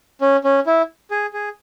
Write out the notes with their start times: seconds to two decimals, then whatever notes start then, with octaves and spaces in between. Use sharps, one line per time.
0.21 C#4
0.44 C#4
0.66 E4
1.11 G#4
1.33 G#4